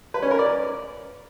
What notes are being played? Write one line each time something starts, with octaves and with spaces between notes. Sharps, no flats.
B4
C#4
A#4
D5